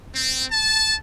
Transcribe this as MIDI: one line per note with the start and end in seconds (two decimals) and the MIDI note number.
0.15 0.44 60
0.51 0.94 81